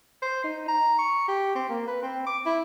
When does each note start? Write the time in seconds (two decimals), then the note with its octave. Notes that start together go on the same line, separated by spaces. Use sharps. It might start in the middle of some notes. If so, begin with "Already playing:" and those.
0.22 C5
0.44 D#4
0.68 A#5
0.99 C#6
1.28 G4
1.55 C4
1.69 A#3
1.87 B4
2.03 C4
2.27 D6
2.46 E4